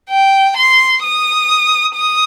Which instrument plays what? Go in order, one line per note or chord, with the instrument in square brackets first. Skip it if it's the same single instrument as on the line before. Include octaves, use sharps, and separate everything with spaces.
[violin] G5
C6
D#6
D#6